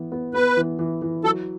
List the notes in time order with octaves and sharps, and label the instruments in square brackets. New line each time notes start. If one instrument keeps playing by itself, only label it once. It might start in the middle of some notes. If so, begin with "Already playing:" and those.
Already playing: [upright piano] E3 B3
B3
[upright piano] B3 [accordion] B4
[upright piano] E3
E3
E3
[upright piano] F#3 [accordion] A4